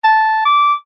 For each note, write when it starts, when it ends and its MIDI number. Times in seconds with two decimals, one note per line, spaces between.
0.04 0.43 81
0.45 0.73 86